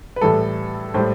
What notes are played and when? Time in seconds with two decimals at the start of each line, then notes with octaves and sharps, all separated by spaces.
0.16 B4
0.21 A2 E3 G3 A4
0.94 A2 G3 C5